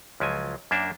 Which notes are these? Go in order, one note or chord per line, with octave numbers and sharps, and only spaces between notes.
C#2 F3 F#3 G#5
F#2 A#3 D4 E5